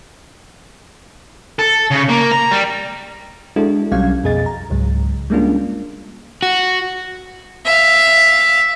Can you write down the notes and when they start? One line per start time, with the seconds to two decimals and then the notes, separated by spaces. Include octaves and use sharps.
1.59 A4
1.91 C#3
2.09 A#3
2.32 A#5
2.51 G3
3.56 G#3 D4 E4 F#4 A4
3.91 B1 F#3 G3 C#4 F5 G#6
4.24 F2 B2 G#4 D#5 A6
4.46 A#5
4.70 C#2 G#2 F#3
5.30 G3 G#3 A#3 C#4 D4 F4
6.42 F#4
7.65 E5 F5